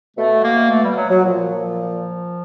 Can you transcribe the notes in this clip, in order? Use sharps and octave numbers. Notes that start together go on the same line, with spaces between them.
B2 A3
A#3
A3
G3
F#3
F#3
A#2 F3
F3